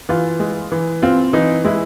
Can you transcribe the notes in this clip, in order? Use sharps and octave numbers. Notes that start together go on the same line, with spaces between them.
E3 F4
G#3
E3
C4 F4
E3 D#4
G#3 E4